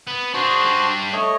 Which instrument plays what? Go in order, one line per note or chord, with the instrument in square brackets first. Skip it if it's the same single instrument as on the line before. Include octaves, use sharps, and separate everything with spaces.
[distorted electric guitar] B3
[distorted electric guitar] D4 G#4 [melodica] F#4 C5 A5
[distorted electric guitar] G3 D4
[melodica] A3 C#5 D#5